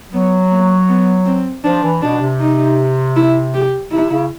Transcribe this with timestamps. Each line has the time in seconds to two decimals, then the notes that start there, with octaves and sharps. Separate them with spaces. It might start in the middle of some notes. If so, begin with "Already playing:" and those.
0.12 F#3 B3
0.51 A#3
0.88 B3
1.26 C4
1.64 F3 D4
1.84 E3
2.02 B2 D4
2.21 C3
2.40 D#4
3.16 E4
3.54 G4
3.92 C3 E4
4.10 C#3